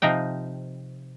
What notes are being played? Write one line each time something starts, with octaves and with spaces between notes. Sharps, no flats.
C3 F3 D#4 G5